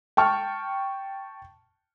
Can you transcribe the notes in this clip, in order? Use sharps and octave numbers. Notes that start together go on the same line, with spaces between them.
G5 A5 C#6 F6